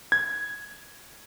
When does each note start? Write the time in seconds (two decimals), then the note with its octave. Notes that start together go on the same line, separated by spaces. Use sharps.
0.12 G#6